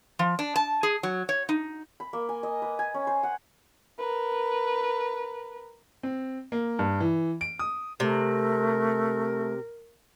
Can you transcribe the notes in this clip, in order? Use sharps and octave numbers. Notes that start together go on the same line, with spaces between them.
F3
D4
A5
G#4
F#3
C#5
D#4
B5
A#3
G#5
D#5
B4
G#5
C#4
C5
F#5
A#4 B4
C4
A#3
G2
E3
D7
D#6
C3 A3 A#4